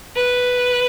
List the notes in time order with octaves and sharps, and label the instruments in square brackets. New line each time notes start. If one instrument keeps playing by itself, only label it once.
[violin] B4